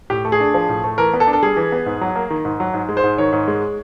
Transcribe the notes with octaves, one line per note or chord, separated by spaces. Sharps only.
A2 G4
A3
G#4
D4
F3
A2
A3
E3 A#4
B3
A4
D4
A4
G3 G#4
E3
B3
G#2
F#3
A#3
D#3
G#2
F#3
G#2
G#3
C5
G#2
D#3 C#5
G#2
G#3